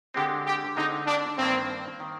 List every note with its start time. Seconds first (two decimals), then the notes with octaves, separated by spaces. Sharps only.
0.14 D3 G#3 C4 G4
0.46 G4
0.76 D3 G#3 C4 D#4
1.07 D4
1.38 G2 D#3 A#3 C4
2.00 D#3 A#3